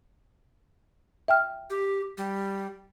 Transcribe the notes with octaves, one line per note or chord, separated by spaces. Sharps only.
E5 G5 F6
G4
G3